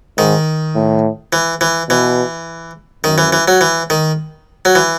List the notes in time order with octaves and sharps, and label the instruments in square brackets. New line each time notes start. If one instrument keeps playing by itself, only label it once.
[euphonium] G#2 [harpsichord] D#3
[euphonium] A2
[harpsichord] E3
E3
[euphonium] B2 [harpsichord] E3
[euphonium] F#2 [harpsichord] D#3
[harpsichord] E3
E3
F#3
E3
D#3
F#3
E3